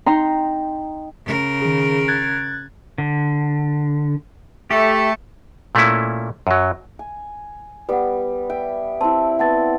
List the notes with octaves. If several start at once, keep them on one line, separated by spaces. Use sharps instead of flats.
D#4 G5 A#5 C6
C#3 A#4
D#3 G#4
F#6 G#6 A6
D3
A3 G4
A#2 A3 A#3 C#4 E4
F#2 F#3
G#5
G3 B3 B4 F#5
E5 G5
C4 E4 A5
B3 C4 F#5 A5 A6